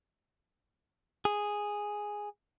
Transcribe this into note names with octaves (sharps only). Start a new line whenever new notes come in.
G#4